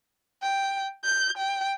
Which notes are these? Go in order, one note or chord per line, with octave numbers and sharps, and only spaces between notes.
G5
G6
G5